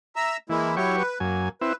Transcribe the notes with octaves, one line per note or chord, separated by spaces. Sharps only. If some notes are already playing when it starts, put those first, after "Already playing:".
E5 A#5 E6
E3 G#3 A#3 E4
F#3 E4 G4 C#5 C#6
B4
F#2 A#3 G#5
C4 E4 B4